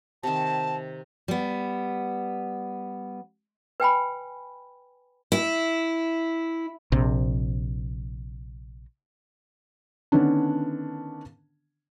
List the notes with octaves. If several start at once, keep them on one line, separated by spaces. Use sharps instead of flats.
C3 D#3 A5
G3 B3
B4 G5 G#5 B5
E4
A#1 C3
D3 D#3 B3 C#4 D4